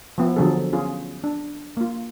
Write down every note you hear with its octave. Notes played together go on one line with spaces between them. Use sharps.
F3 B3 E4
D3 F3 F#3 D4 G#4 A4
B3 C#4 F4 G#4
D4
A#3 F4